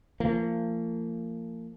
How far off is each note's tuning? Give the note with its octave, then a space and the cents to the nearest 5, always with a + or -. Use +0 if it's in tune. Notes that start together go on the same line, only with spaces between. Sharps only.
F3 -35 A#3 -40